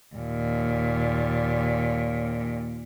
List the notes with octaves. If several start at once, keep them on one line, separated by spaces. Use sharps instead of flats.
D#2 A#2